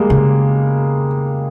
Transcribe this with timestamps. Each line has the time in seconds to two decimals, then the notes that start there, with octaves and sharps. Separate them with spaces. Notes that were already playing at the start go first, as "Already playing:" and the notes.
Already playing: G3 G#3 A#3
0.10 C#3